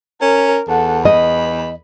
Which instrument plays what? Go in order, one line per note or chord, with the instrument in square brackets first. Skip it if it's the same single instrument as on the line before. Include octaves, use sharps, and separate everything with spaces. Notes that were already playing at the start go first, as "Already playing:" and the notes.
[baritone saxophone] C#4 [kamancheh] A#4
[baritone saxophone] E2 [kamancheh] A4 F#5
[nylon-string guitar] D#5 [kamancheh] B5